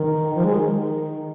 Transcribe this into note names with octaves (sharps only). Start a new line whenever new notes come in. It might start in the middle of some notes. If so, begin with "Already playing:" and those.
Already playing: D#3
F3
G#3
D#3